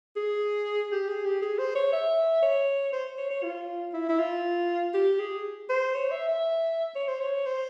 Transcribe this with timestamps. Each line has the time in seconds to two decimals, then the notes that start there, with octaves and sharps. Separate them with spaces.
0.16 G#4
0.92 G4
1.08 G#4
1.25 G4
1.42 G#4
1.59 C5
1.75 C#5
1.92 E5
2.43 C#5
2.92 C5
3.18 C#5
3.31 C#5
3.43 F4
3.93 E4
4.09 E4
4.19 F4
4.94 G4
5.19 G#4
5.70 C5
5.95 C#5
6.11 E5
6.28 E5
6.95 C#5
7.08 C5
7.21 C#5
7.46 C5